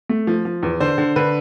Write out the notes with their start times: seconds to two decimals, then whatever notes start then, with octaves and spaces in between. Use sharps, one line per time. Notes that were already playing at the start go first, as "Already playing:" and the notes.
0.09 A3
0.27 F3
0.45 F3
0.63 E2
0.80 D3 C5
0.98 D3
1.16 D3 B4